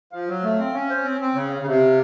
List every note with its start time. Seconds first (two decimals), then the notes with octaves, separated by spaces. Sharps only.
0.12 F3 F5
0.28 F#3
0.44 A3
0.59 C4
0.74 C#4 C#5
0.90 C5
1.05 C4
1.21 C4
1.35 C#3 C#5
1.51 F5
1.61 C#3
1.67 C3